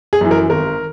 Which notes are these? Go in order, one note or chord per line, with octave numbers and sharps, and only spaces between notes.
G#4
F#2 E3
A#4
G#1 A#4